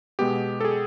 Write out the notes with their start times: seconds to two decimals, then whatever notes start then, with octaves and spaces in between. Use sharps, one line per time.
0.19 B2 G#3 B3 G4
0.61 A4
0.65 G#4